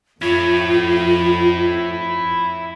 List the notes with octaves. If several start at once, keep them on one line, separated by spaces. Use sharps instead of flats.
F2 E4 F4 C#5